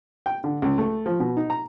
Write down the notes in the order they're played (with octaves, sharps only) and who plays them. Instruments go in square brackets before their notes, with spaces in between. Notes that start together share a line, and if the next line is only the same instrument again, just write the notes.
[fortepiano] G5
D3
C#2
A3
F3
B2
D#4
A#5